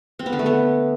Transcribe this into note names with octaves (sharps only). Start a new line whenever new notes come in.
C4
B3
D3
A3
B3